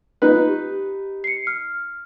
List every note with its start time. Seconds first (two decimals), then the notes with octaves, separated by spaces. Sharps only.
0.22 D#4 F4 B4 F#6
0.48 G4
1.24 C7 C#7
1.47 F6